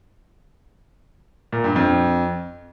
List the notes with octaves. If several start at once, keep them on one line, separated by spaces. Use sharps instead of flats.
A#2
G2
F2